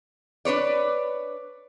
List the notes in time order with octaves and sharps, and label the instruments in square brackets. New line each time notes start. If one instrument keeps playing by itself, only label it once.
[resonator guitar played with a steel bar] D4 B4 C#5 D5